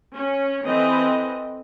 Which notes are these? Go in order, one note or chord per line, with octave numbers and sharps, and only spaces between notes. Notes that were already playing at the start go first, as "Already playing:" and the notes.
C#4
E3 C4 A4 B4 D#5